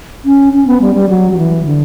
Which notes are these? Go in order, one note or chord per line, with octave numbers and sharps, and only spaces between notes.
C#4
C#4
B3
G3
G3
F#3
F#3
E3
D3